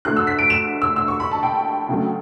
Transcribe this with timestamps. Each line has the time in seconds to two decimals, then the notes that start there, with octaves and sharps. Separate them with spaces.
0.05 D2 D3 A3 F#6
0.17 E6
0.27 B6
0.39 D7
0.50 E7
0.82 E6
0.96 E6
1.08 C#6
1.20 B5
1.31 A5
1.43 G5
1.88 D2 C#3 F#3 A3